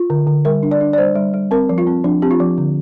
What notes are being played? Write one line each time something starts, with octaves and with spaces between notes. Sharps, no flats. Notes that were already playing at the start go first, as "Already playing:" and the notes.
Already playing: F4
D3
D3
G3 A#4
D4
D5
D4
D5
G3 C5
G3
G3
C4 A#4
F3
F4
C4
F3 D4
C4 G4
F4
F3
D3